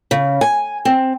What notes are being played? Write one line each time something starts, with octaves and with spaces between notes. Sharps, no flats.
C#3
G#5
C4